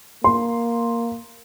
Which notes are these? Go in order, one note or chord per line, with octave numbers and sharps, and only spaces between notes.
A#3 C6